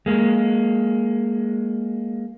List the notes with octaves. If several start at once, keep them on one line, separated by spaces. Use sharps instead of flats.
G#3 A#3